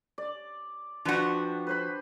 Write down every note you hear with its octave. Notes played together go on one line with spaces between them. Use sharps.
D5
F3 D4 F#4 B4 G5
B4 C5 B5